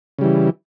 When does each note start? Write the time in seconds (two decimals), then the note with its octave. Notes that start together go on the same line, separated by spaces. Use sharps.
0.19 C#3
0.21 G3
0.24 E3